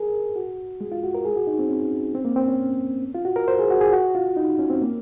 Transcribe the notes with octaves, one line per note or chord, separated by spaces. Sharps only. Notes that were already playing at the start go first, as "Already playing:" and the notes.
Already playing: G#4 A#4
F#4
G#3
F4
F#4
A#4
G#4
F#4
D#4
C4
C#4
C4
A#3
C4
C#4
F4
F#4
A#4
C5
G#4
F#4
G#4
F#4
F4
D#4
C#4
C4
A#3